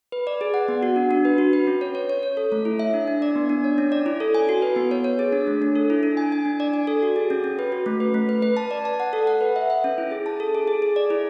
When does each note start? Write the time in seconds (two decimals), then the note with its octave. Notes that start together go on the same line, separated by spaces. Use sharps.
0.12 B4
0.27 D5
0.41 G#4
0.54 F#5
0.68 B3
0.83 F#4
0.96 D4
1.11 D4
1.25 B4
1.38 F#4
1.53 B4
1.67 C#4
1.81 C#5
1.95 C#5
2.10 C#5
2.23 C#5
2.37 A4
2.52 A3
2.65 E4
2.79 E5
2.94 D4
3.08 D4
3.22 D5
3.36 B3
3.49 D4
3.64 C#5
3.78 C#4
3.92 D5
4.06 E4
4.20 A4
4.35 G#5
4.49 F#4
4.62 B4
4.76 B3
4.91 C#5
5.04 C#5
5.19 G#4
5.32 D4
5.47 A3
5.62 D4
5.76 A4
5.90 E4
6.03 D4
6.17 G#5
6.32 G#5
6.45 D4
6.60 D5
6.73 G#5
6.87 A4
7.03 F#4
7.16 G#4
7.30 C#4
7.44 C#4
7.59 B4
7.72 F#4
7.86 A3
8.00 B4
8.14 A3
8.29 B4
8.42 B4
8.57 A5
8.71 D5
8.85 A5
9.00 F#5
9.13 A4
9.27 F#5
9.41 B4
9.56 E5
9.70 E5
9.84 C#4
9.98 E4
10.11 G#4
10.26 A5
10.40 A4
10.55 G#4
10.67 G#4
10.82 G#4
10.96 D5
11.10 E4